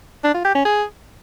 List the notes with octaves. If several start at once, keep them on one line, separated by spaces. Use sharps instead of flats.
D4
F4
G4
C#4
G#4